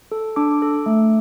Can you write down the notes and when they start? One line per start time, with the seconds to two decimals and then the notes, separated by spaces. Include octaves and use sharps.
0.12 A4
0.36 D4 D6
0.62 A4
0.86 A3